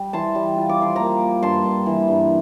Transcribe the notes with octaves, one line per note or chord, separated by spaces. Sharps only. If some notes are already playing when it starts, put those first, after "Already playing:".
Already playing: G3
E3 A5 C6
G3
F4
D6
F3 C6
A#3 A#5 D6
A#3
G2 A5 C6
G2
E3
G2